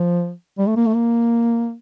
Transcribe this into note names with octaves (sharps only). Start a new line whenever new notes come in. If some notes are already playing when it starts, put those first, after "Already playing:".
Already playing: F3
G3
A3
A#3
A3
A#3